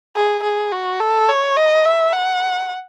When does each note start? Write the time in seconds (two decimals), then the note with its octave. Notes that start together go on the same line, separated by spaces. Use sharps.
0.16 G#4
0.44 G#4
0.72 F#4
1.00 A4
1.29 C#5
1.57 D#5
1.85 E5
2.13 F#5